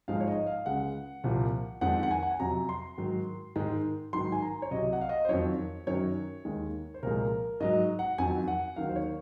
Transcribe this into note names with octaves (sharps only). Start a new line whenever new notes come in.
G#2 F3 G#3 F5
C#5
D#5
F5
C#2 C#3 G#3 F#5
C2 A#2 F3
F2 D#3 G#3 F#5
F#5
G#5
F#5
G#5
F2 C3 F#3 A#5
C6
G#2 D#3 F#3
G#2 D#3 G#3
G#2 D#3 F#3 C6
G#5
A#5
C#5
C2 C3 F#3 D#5
F#5
F5
D#5
C5
F2 D#3 F#3 C#5
F#2 D#3 F#3 C#5
D#2 D#3 G#3
C5
C2 A#2 F3 G#3 A#4
G#2 F#3 D#5
F#5
F2 D#3 F#3 G#5
F#5
D#2 D#3 F#3 F5
C5
C#5